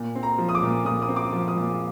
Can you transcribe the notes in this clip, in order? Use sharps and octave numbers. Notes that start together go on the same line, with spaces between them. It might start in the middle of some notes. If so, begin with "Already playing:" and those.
Already playing: A#2
C4
A#5
F3
D#6
D6
A#2
A#2 D#6
D#6
C4
D6
F3
D#6
A#2